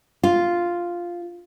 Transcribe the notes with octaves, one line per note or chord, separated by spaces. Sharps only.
F4